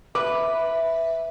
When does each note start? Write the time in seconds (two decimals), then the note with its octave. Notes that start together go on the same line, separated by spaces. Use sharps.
0.15 B4 E5 D6